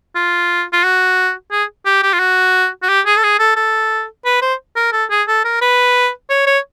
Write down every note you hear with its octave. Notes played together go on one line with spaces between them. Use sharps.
F4
F4
F#4
G#4
G4
G4
F4
F#4
F#4
G4
G#4
A4
G#4
A4
A4
B4
C5
A#4
A4
G#4
A4
A#4
B4
C#5
C#5